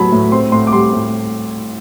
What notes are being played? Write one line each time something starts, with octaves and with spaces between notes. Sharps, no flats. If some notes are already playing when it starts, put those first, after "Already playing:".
Already playing: A2 F#3 B3 A5 B5
A2
C4 C6
A2 C6
D6
G3 C6
A2